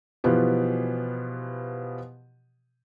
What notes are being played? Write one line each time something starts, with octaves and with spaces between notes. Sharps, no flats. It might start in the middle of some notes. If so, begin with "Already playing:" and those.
B2 E3 F3 B3 G4